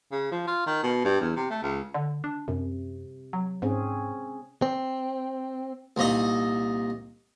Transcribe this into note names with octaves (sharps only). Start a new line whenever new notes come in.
C#3
F3
F4
D#3
B2
G2
E2
C3
A3
C#2
D3
D4
F#2 C3
F#3
G#2 C4 C#4 G#4
C4
C2 A#2 D#4 D#5